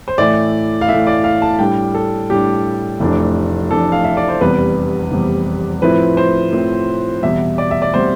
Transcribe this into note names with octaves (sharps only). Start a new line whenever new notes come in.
C5
A2 E3 A3 E4 D5
F5
A2 E3 A3 E4 E5
D5
F5
A5
A2 G3 D4 G5
A4
A2 G3 D4 G4
F1 F2 E3 A3 D4
F1 F2 E3 A3 D4 A4
F5
E5
D5
C5
F1 E2 C3 G3 B4
F1 E2 C3 G3
A2 F3 C4 E4 B4
C5
A2 F3 C4 E4
E2 B2 G3 C4 E5
D5
E5
D5
B2 G3 C4 C5